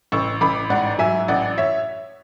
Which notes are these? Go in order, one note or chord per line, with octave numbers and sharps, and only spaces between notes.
A1 C#6 E6
A1 B5 D6
G#2 D5 F#5
F#3 E5 G#5
A1 D5 F#5
C#5 E5